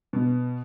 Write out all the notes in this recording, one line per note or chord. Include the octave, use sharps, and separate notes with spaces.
B2